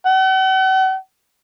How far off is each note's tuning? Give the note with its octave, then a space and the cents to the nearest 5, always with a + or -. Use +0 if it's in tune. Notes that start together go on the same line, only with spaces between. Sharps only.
F#5 +45